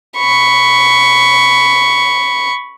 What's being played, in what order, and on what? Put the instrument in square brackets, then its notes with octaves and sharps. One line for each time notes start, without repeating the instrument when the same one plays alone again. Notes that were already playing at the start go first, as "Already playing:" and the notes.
[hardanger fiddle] B5 C#6